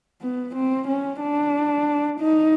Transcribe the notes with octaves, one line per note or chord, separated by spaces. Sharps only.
B3
C4
C#4
D4
D#4